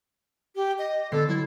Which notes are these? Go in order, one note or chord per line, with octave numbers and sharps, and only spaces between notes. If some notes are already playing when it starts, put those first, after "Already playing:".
G4
D#5
D3 B3 A4 C7
F#3 E4